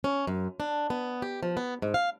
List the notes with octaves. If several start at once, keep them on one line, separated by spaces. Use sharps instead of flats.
C#4
F#2
D4
B3
G4
F3
B3
G#2
F5